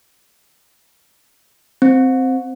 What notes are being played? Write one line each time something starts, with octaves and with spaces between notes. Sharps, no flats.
C4